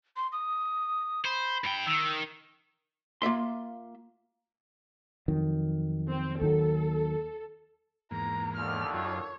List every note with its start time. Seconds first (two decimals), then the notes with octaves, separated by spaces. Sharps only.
0.16 C6
0.32 D#6
1.25 C5 B5
1.64 G2 G5
1.86 D#3 E6
3.22 A#3 F4 E5 C6
5.28 F2 D#3 F#3
6.10 C4
6.41 D#2 D#3 F#3 A4
8.11 E2 G#2 A#3 A#5
8.57 D#2 D3 F6
8.94 F#2 F4 C#5